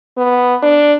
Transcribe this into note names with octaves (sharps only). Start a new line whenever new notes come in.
B3
D4